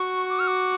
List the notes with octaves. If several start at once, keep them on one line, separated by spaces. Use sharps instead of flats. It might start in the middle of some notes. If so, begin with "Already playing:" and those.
Already playing: F#4 C#6
D6
F6
D6